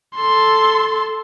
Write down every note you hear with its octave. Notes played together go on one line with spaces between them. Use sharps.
A4 C6